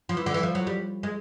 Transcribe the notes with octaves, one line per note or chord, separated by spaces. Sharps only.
F3
E3
D3
E3
F3
F#3
G3
G#3